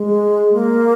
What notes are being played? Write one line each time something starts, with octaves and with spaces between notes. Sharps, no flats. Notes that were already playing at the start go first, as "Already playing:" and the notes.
Already playing: G#3
A#3